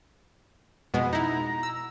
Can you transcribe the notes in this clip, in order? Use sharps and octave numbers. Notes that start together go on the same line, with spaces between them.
F2 B2 G#3 B3
D#4 E4 A#5
E6